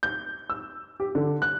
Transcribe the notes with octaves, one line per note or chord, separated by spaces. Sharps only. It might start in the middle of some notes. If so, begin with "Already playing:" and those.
G6
E6
G4
D3
F#6